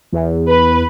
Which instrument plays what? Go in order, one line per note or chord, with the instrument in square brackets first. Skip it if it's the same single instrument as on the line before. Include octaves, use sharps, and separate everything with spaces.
[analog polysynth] E2
[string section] B4